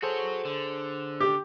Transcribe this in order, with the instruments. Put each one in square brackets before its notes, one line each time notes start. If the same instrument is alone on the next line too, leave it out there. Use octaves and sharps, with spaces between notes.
[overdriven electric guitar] F#4 C#5 [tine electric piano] G#4 A4 C5
[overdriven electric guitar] D3
[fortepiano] G4